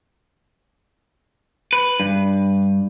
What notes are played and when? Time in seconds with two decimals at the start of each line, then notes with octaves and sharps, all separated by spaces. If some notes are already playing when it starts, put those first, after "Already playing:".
1.73 B4
2.00 G2